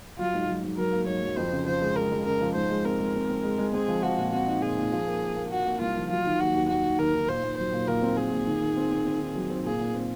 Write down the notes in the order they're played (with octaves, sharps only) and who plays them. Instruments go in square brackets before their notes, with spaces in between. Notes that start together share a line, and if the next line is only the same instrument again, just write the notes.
[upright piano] F#3 [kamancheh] F4
[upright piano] G#2
F#3
G#2
[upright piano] F#3 [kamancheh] A#4
[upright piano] A#3
[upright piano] G#2 [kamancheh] C#5
[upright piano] F#3
[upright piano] F2 [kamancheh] C5
[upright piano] C#3
[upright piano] F3 [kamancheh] C5
[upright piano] G#3
[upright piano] G#3 [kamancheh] A#4
[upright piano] G#3
[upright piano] C#3 [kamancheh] A#4
[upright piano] F3
[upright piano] G#2 [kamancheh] C5
[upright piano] G#3
[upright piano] C4 [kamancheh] A#4
[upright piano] G#3
C4
C4
G#3
G#3
[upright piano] C4 [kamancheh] G#4
[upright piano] F3
[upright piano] F3 [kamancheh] F#4
[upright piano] A#2
[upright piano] C4 [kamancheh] F#4
[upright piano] D#4
[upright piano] A#2 [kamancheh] G#4
[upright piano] A#2
F3
A#3
A#3
A#3
[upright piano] A#3 [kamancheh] F#4
[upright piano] A#3
[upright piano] C2 [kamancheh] F4
[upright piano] F3
[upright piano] F#3 [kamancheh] F4
[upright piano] D#3
[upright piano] D#2 [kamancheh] F#4
[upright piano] D#2
[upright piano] D#2 [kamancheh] F#4
[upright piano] D#3
[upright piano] D#2 [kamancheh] A#4
[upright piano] D#3
[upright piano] A#2 [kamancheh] C5
[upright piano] A#2
[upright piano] F#3 [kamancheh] C5
[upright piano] A#2
[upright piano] A#2 [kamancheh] A#4
[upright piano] C4
[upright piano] C4 [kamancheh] G#4
[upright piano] A#2
D#3
D#3
C4
C4
C4
D#3
F#3
C4
[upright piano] A#2 [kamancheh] G#4
[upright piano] A#2
C4